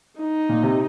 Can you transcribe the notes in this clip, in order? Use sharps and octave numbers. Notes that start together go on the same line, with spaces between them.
D#4
A#2
C3